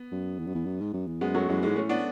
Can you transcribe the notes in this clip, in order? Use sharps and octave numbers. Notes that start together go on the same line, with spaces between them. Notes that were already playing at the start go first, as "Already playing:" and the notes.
Already playing: B3
F#2
E2
F#2
E2
F#2
G#2
F#2
E2
F#2 G#3 B3
F#3 A3
F#2 E3 G#3
G#2 E3 G#3
A2 A3 C#4
B3 D4